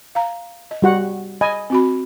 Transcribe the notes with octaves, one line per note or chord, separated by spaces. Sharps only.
F5 A#5
D#5
G3 F#4 F#5
D#5 G#5 B5
C4 F#4 B5